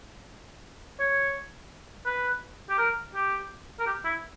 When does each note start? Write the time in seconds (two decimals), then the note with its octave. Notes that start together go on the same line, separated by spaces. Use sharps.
1.00 C#5
2.06 B4
2.70 G4
2.78 A#4
3.15 G4
3.80 A#4
3.87 G4
4.05 E4